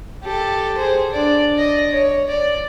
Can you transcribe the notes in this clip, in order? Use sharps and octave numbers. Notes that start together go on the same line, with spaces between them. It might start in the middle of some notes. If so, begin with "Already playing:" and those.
G4 A4
G#4 C5
D4 D5
D5 D#5
C#5
D5